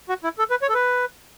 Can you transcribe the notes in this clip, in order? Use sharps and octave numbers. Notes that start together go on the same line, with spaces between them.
F#4
E4
A4
B4
C#5
A4
B4